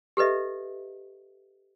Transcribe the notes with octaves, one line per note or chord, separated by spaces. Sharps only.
G4 A4 B4 D#5 E5